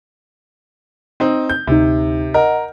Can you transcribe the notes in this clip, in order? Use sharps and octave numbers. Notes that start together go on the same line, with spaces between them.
C4 D#4
G6
D2 C3 D#4
A#4 D#5 F#5